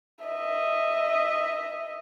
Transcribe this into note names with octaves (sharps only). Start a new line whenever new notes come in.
D#5 E5